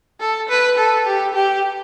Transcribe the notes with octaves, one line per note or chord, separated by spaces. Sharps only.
A4
B4
A4
G4
G4